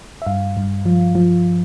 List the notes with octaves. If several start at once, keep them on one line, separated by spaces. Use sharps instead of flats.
E5
G2 F5
G2
F3
F3